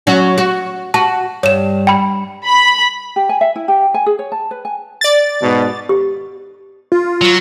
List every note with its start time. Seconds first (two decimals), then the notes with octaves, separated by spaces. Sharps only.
0.07 F#3 C#4 F#4
0.38 F#4
0.94 F#4 A5
1.43 G2 C#5 E7
1.87 G5 B5
2.46 B5
3.16 G4
3.29 G#5
3.41 E5
3.56 E4
3.68 G4
3.94 G#5
4.06 G#4
4.19 C#5
4.32 A5
4.51 B4
4.65 G#5
5.01 D5 A6
5.41 G#2 B2
5.89 G4
6.92 F4
7.21 F#3